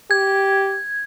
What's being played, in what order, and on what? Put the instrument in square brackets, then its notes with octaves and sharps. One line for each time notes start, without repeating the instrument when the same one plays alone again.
[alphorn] G4 [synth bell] G#6